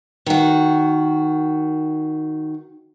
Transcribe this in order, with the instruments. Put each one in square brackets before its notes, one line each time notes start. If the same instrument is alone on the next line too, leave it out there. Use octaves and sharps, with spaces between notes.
[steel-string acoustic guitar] D#3 F#4